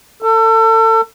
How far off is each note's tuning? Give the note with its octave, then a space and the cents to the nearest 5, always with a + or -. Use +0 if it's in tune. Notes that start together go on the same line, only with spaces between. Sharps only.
A4 +30